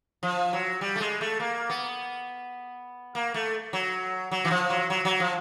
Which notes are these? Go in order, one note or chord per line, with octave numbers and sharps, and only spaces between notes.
F3
F#3
G3
A3
G#3
A3
A#3
B3
A#3
A3
F#3
F#3
E3
F3
F#3
F#3
F#3
F3